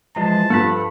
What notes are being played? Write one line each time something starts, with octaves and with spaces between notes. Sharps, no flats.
E3 F3 G#3 A5
G2 F3 A4 F#5 B5